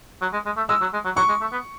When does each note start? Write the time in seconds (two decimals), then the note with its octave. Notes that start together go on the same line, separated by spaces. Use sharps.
0.22 F#3
0.33 G#3
0.46 G#3
0.57 A3
0.69 G#3 E6
0.81 F#3
0.93 G#3
1.05 F#3
1.16 F#3 C#6
1.28 G#3
1.41 A3
1.52 B3